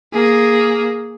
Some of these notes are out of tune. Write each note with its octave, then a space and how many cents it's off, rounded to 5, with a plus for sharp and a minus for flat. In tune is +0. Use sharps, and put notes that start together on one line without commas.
A#3 +0 G#4 +0